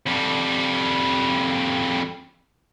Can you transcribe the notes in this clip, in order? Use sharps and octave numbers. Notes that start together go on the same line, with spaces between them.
F2 G3